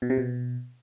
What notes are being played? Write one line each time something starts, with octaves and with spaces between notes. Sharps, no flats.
B2
C3
B2